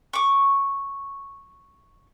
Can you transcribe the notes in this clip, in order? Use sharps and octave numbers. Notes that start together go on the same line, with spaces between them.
C#6 D6